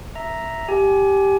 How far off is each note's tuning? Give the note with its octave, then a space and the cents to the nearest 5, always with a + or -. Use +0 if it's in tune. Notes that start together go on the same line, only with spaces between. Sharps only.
E5 +0 A#5 +0
G4 +0 G#5 +30